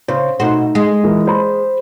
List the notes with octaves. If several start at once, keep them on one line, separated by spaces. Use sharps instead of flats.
C#3 C5
B2 A3 D#4 F#4 C5
G#3
A#2 E3 A#4
C5 B5